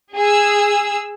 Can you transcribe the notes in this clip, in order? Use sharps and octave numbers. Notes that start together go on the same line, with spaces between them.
G#4 E6